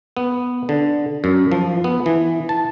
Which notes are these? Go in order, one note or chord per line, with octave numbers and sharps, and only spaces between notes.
B3
D3
F#2
F3
B3
E3
A5